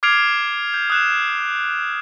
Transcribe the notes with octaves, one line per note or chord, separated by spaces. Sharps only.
D6 F6 G#6 C7 D7 F7
G6
D#6 F#6 E7